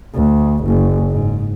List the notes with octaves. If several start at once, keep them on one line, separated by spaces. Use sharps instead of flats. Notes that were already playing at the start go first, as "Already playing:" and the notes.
D2
F#1
G#2